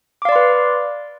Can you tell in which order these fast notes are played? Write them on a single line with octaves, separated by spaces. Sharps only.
D6 F5 D5 C6 B4